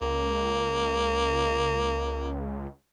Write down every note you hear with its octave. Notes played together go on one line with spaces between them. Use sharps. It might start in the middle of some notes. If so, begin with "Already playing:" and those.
C#2 A#3